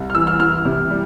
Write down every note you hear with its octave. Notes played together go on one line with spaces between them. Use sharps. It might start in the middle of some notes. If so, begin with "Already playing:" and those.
Already playing: C2
F6
E3 E6
F6
E3 F6
C3
G3